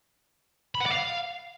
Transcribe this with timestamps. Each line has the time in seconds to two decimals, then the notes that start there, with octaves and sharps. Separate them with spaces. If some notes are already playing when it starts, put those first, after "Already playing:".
0.75 B5
0.80 F#5
0.86 D5
0.91 F5